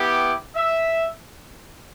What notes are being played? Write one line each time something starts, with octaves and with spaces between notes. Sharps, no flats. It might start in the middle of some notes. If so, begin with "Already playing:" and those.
Already playing: B3 E4 G4
E5